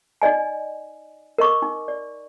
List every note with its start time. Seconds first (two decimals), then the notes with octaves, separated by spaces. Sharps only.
0.22 D#4 D5 D#5 G#5
1.38 A#4 D#5 C#6 D6
1.62 D#4
1.88 D5